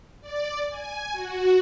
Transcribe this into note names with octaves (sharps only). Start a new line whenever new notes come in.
D5
G#5
F#4